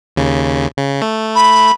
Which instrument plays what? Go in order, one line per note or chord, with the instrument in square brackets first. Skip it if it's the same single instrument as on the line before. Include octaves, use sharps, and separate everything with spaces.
[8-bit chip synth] D#2 C#3
C#3
A3
[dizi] B5